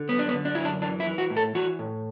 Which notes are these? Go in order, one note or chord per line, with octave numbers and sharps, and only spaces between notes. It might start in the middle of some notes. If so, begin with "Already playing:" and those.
Already playing: D3
F#2 B3
D4
B3
D3
D4
F#2 E4
D4
E3 D4
E4
E3
F#4
A2
A4
E3 F#4
A2